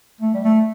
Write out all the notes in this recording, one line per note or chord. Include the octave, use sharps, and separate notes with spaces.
A3
G3
A3